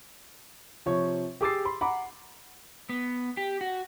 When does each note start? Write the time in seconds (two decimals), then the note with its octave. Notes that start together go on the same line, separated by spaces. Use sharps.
0.86 C3 F3 C#5 C#6
1.41 G4 G#4 D6 E6 A6 C7
1.65 B5 C6
1.81 F#5 A#5 B5 D6
2.89 B3
3.37 G4
3.61 F#4